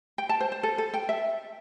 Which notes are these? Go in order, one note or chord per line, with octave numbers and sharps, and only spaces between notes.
G5
A5
C5
C5
A4
A4
G5
E5